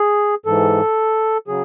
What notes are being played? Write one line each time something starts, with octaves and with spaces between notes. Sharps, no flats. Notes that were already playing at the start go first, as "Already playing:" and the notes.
Already playing: G#4
G#2 E3 A4
C#3 F#3 G#4